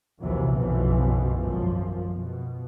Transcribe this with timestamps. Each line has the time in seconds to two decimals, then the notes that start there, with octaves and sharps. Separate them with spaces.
0.20 A#1 D#2 C3 E3 F#3
0.50 F#1 B1 B2 E3 F3
1.38 G#1 F#2 F3
2.13 B2